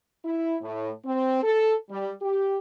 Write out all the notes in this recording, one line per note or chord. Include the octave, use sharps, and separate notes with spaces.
E4
A2
C4
A4
G3
G4